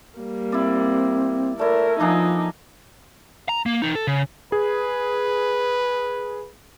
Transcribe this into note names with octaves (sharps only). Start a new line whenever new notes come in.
G3 A#3
C4 E4 D5
A3 E4 A#4 D5
F3 A#3 D4 D#4 G#4
A#5
A#3
E3 D#4
A4
C#3
G#4 B4